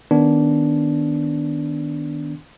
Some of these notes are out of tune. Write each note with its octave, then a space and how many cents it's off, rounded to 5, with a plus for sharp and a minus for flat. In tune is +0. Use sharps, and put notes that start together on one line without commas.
D#3 +0 B3 +0 D4 -15